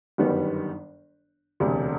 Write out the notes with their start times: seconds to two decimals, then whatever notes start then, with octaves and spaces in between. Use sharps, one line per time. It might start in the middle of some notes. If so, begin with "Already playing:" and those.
0.18 G1 F#2 D#3 G3 B3
1.60 E1 D2 C3